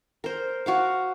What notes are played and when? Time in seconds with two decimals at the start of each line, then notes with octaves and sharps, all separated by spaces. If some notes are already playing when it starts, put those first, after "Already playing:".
0.24 A#4 C5
0.66 F#4 F5 D6